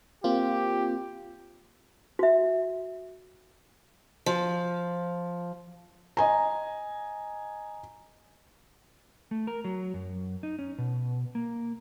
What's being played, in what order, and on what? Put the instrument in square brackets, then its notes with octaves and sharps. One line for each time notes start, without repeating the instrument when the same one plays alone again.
[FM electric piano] A#3 C4 F4 [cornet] G4
[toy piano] F#4 E5
[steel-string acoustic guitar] F3
[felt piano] D#5 G#5 A#5
[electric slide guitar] A3
A#4
F#3
F#2
D#4
C#4
B2
A#3